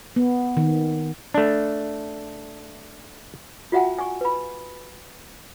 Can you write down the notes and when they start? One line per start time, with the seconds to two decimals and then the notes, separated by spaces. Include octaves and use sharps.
0.16 B3
0.57 D#3
1.34 A3 D4
3.72 F4 F#4 E5 F#5 G5 A5
3.99 G#5 C#6
4.21 B4 B5